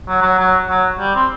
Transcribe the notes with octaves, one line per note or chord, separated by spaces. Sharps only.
F#3
F#3
F#3
F#3
G3
C4